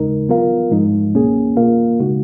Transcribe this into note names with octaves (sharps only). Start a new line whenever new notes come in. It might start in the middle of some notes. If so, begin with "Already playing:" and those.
Already playing: D#2 C#3 G#3 D#4 A#4
F#3 B3 F4 A#4 F5
G#2 F3 G#3 D#4
C#2 B2 A#3 C#4 G#4
B2 A#3 F4 A#4 F5
C#3 G#3 D#4 F#4